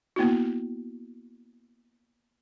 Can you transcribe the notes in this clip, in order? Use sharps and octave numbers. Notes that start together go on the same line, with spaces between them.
A#3 B3 E4 F#4